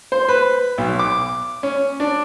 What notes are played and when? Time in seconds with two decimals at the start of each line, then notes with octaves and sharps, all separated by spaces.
0.12 C5
0.29 B4
0.78 B1
0.99 D6
1.63 C#4
2.00 D4